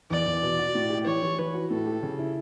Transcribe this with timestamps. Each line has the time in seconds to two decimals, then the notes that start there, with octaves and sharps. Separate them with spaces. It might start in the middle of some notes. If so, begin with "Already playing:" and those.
0.11 E2 D5
0.27 E2
0.43 B2
0.59 F#4
0.75 A2
0.90 G4
1.06 E3 C#5
1.22 E3
1.38 E3 B4
1.54 F#4
1.70 A2 A4
1.86 G4
2.03 C#3
2.19 E4